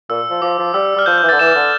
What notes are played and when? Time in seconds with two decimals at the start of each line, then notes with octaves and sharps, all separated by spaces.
0.09 A#2 E6
0.30 F3
0.42 F3 D6
0.59 F3
0.74 G3 E6
0.96 G3 F6
1.06 F3 G6
1.18 G6
1.23 E3
1.29 D3 A6
1.39 E3 E7
1.55 D3